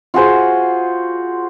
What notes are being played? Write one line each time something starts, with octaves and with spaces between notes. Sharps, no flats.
F4 F#4 G#4 C5